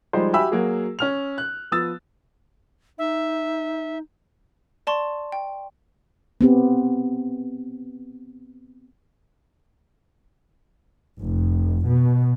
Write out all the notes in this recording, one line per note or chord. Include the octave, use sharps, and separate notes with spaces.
F3 G3 G#3 D#4 C5
F#4 G4 E5 G#5 B5 E6
F#3 A#3 F#4 G#4
C#4 F6 F7
F#6
F3 B3 D#6 E6 A6
D#4 E5
D5 A5 C6 C#6
G5
B3 C4 G4
F1
B2